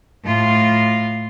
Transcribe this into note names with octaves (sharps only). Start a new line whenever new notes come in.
A2 F4